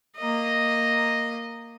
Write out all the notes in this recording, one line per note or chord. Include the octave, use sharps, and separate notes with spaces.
A#3 D#5